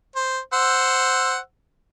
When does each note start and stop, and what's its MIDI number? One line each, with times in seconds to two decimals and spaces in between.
0.16 0.39 72
0.53 1.38 72
0.53 1.38 78
0.53 1.38 88